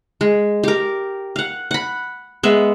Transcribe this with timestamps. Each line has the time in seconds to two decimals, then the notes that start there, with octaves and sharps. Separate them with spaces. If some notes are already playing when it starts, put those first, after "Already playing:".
0.21 G#3
0.63 G4 A#4
1.36 F5 F#5
1.71 F#5 B5
2.43 G#3 B3 E5